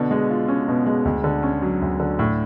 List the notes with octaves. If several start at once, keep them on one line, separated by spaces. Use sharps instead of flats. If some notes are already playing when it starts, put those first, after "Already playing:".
Already playing: B2 D3
G#3
F4
C#4
B2
G#3
D2
D3
C#4
F#3
D2
D3
A2